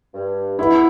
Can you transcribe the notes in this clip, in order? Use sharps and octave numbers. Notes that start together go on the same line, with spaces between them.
G2
B3 E4